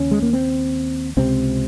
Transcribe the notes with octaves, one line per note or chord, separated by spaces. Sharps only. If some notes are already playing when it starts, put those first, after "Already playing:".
Already playing: D#2 C#3 C#4
G#3
A#3
C4
C#2 C3 C4